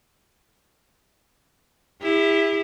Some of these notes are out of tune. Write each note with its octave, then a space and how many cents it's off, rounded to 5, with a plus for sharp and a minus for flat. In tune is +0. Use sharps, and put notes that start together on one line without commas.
E4 -5 G4 +45